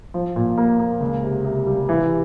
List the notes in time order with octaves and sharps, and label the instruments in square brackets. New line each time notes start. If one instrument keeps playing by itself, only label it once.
[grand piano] F3
A#2
A#3
A#3
C#2
C3
C3
G3
E3